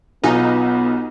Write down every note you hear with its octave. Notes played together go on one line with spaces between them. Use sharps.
B1 B3 D#4 F4 G#5